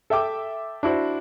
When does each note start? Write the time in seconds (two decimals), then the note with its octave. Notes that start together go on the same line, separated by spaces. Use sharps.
0.10 A4 E5 G5 D6
0.83 D4 E4 F#4 C5